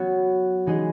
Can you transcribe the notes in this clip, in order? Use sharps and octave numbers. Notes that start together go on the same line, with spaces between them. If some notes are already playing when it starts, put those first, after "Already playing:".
Already playing: F#3 B3 F#4 C#5
E3 G#3 D#4 G#4 D#5